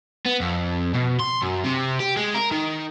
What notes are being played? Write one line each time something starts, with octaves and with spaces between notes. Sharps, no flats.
B3
F2
B2
C6
F#2
C3
G4
G#3
A#4
D#3